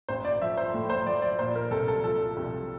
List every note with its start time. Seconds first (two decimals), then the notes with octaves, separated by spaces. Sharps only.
0.09 A1 C5
0.25 D5
0.42 F3 E5
0.57 C5
0.74 A2
0.90 C5
1.07 F3 D5
1.22 D5
1.39 A#2 C5
1.55 A#4
1.71 C2 A4
1.88 A4
2.04 F3 A4
2.37 C2